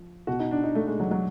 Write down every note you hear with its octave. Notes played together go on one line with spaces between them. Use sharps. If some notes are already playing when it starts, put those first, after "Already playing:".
Already playing: F3
B2 F#4
D#4
D4
D#4
A3
G#3
F#3
F#3